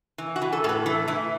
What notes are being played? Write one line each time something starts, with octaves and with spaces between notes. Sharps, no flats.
E3
F#4
E3
A4
A2 A4 B4
E3 A4
E3 E4